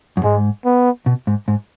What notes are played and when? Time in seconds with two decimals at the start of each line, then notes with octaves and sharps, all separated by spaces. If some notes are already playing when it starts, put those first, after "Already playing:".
0.17 F#2
0.24 G#2 G#3
0.65 B3
1.06 B2
1.27 G#2
1.48 G#2